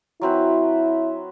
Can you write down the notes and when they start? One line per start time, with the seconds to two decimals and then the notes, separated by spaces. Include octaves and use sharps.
0.22 F#3 C4 E4 B4